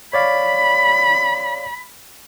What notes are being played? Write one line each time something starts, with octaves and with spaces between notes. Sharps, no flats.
C#5 D5 F5 B5